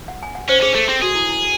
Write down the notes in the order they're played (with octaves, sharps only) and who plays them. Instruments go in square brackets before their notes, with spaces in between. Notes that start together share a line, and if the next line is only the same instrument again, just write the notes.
[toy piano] F#5
G#5
F#5
[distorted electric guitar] C#4 [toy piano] C5
[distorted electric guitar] C#4 [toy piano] G#4
[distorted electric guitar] A3 [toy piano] A4
[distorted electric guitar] C4 [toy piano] G#4
[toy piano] F#4 [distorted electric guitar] G#4
[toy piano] E4
E4